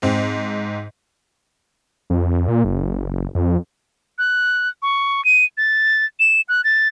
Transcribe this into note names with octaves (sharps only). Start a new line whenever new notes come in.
G#2 C4
F2
A#2
F#1
F2
F#6
C#6
D#7
A6
E7
F#6
A6